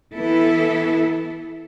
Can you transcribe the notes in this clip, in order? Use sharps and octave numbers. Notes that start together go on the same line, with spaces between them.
E3 B3 E4 A4